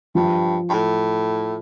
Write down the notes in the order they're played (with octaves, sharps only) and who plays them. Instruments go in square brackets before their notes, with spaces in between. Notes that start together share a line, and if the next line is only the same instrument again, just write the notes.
[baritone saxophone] G2 [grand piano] F3
[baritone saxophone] G2
A2